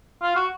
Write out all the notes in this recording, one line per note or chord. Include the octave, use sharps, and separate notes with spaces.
F4
F#4